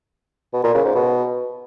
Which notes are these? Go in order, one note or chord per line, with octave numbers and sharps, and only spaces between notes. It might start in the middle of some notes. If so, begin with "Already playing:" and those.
B2
A#2
C#3
G#2
B2